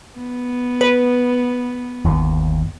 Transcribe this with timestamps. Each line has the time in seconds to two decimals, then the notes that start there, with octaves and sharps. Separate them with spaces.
0.17 B3
0.81 B4
2.05 G1 D#2